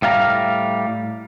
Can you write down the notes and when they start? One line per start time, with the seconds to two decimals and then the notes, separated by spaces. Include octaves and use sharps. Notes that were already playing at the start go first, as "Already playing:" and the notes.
0.02 A2 G3 F5 G#5 A#5